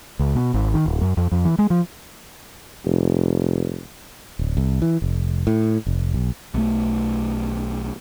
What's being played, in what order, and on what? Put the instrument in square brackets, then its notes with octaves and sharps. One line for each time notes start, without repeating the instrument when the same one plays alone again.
[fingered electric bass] C#2
B2
G#1
D#3
D1
F#2
F2
F2
E3
G#3
F3
[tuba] F1
[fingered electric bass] D1
C2
E3
F1
A2
F1
B1
[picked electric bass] B1 A3